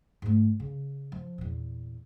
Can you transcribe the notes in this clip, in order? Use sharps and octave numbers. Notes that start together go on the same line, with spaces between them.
G#2 A3
C#3
F3
E2 A#2